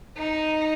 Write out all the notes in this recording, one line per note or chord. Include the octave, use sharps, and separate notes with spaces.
D#4